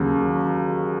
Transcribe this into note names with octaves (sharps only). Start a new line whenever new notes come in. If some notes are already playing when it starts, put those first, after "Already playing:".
Already playing: D#2 C#3 F#3